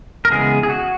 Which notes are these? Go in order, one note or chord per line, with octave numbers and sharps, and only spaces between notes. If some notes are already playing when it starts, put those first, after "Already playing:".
A#4
C#3 E3 G#3 B3 G#4
G#4
F#4